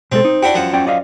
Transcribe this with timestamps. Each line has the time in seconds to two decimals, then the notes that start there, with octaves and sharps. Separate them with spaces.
0.12 B2 G#3 C4 A4
0.25 D#4
0.43 D4 E4 F#4 G5
0.55 F#2 F3 F#5
0.73 C#4 D5 G5
0.87 D5 D#5 F5